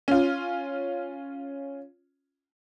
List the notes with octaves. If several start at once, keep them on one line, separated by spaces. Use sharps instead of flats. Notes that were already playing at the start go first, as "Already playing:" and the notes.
C#4 F4